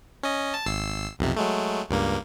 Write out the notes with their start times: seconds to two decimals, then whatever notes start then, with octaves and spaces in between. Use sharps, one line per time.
0.23 C#4 D#5
0.54 A5
0.66 G#1 E6 C7
1.19 B1 F2 C3
1.37 F#3 G#3 A3
1.90 C#2 G2 A#3